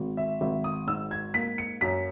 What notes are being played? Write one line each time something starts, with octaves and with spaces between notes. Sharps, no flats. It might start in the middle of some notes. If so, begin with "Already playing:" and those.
Already playing: G#1
E5
G#1 E5
D#6
G#2 E6
G#6
A#3 B6
C#7
F#2 B6